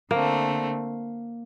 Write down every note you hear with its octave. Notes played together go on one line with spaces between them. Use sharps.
D3 A3 A#3 C4